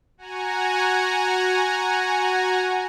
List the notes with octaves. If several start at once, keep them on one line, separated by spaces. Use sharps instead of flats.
F#4 F#5 G#5 A#5